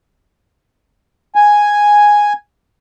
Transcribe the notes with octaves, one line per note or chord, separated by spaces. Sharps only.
G#5